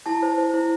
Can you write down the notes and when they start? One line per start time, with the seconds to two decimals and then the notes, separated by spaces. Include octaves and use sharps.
0.06 E4 A5
0.23 C5
0.38 C5
0.54 E4